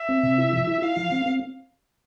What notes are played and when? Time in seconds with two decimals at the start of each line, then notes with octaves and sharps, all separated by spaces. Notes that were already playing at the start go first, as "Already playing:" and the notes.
Already playing: E5
0.09 C4
0.23 C3
0.38 E4
0.53 F3
0.67 E4
0.82 E4 F5
0.97 F3
1.12 C4
1.26 C4